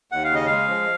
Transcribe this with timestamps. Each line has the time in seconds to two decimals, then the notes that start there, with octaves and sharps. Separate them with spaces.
0.12 D#2 F#5
0.24 F5
0.31 C#3 D#5
0.46 G#3 F5
0.69 F3